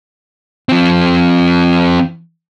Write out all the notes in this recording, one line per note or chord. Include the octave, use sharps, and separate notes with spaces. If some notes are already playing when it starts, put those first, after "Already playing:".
F3 C4